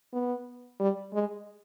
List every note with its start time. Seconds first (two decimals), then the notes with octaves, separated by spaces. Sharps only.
0.13 B3
0.80 G3
1.14 G#3